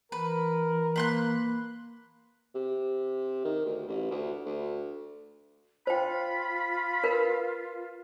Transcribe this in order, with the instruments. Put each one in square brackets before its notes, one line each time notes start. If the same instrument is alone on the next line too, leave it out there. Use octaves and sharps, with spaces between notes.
[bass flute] E3 [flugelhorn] A#4 [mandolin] B4
[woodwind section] A#3 [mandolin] B4 C6 F#6
[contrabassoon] C3
D#3
D2
A1
D2
D2
[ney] F4 [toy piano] C5 G5 [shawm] B5
[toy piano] A#4 B4